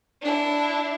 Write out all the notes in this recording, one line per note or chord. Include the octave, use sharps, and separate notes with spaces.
D4 E4